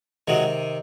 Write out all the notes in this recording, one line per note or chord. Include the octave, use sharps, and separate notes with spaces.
C3 D#3 F#3 G#3